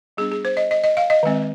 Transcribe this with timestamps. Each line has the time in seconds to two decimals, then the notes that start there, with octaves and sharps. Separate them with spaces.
0.17 G3 B3 D4 G#4
0.32 G#4
0.45 C5
0.57 D#5
0.71 D#5
0.84 D#5
0.97 F5
1.10 D#5
1.23 D#3 G#3 C4